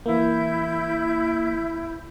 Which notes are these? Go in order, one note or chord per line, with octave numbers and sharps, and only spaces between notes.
E3 A#3 E4 G6